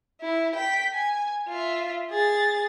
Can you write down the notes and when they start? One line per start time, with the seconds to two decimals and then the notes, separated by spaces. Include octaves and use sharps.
0.21 E4
0.56 G5 B6
0.95 G#5
1.49 F4 E5
2.11 G#4 A6